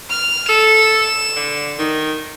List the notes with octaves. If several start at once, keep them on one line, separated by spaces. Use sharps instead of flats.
F6
A4 E7
D3
D#3